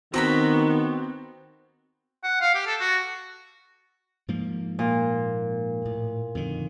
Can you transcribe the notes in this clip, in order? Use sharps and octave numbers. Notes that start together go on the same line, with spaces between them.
D#3 B3 C4 F#4 A#5 B5
F#5
F5
G4
A4
F#4
G#2 F3 A#3
A#2
A2
F2 D3 D#3